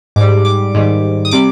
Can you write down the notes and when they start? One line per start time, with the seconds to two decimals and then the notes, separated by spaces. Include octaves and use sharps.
0.16 G#2 G3 D6
0.45 D6
0.74 G#2 D#3 G3
1.25 D#6
1.31 C3 G3 D6